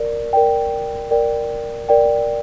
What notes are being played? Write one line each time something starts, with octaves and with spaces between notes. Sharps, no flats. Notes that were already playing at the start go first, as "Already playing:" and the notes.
Already playing: A#4 D5
A#4 D5 G5
A#4 D5 G5
A#4 D5 G5